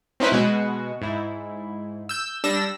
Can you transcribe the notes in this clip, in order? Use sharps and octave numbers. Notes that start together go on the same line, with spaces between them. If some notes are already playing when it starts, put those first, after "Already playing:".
C4 C#4 D#4 E4 B4 C5
B2 G#3 F#4
G#2 E4
E6 G6
G3 D4 E6 A#6 E7